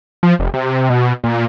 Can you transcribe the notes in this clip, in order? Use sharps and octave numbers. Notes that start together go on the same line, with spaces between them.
F3
F1
C3
B2
A#2